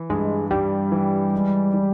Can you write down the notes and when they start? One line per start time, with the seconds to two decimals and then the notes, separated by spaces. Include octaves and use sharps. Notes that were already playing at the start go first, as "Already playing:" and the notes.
Already playing: E3
0.10 G2 G#3
0.51 G2 G3
0.92 E3
1.33 G#3
1.74 E3